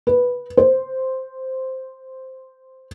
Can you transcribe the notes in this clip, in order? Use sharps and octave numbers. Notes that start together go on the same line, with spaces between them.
B4
C5